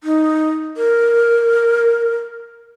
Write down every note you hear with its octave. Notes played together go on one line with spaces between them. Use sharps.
D#4
A#4